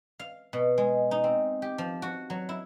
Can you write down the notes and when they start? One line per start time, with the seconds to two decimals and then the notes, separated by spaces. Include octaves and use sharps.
0.19 F5
0.53 B2
0.78 G#3
1.11 D#4
1.24 C4
1.62 G4
1.78 F3
2.02 F#4
2.30 F#3
2.49 E4